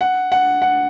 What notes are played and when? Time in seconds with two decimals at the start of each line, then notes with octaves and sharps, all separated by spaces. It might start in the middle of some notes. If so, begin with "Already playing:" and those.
0.01 F#5
0.32 F#5
0.62 F#5